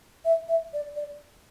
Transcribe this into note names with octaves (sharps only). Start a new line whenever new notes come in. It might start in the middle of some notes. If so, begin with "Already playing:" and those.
E5
E5
D5
D5